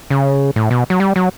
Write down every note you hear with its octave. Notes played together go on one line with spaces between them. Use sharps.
C#3
A2
B2
F#3
G3
F#3